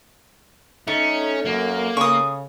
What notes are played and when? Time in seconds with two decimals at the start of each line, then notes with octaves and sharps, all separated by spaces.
0.88 A3 C#4 D#4
1.46 F#2 A#3
1.97 C#3 C#6 D#6